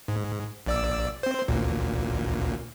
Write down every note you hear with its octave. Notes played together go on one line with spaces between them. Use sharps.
G#2
A#1 D5 E6
C4 C5
A1 D2 A#2